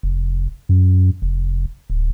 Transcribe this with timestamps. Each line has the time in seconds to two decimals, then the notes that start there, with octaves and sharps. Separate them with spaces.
0.03 F1
0.69 F#2
1.22 F1
1.90 D1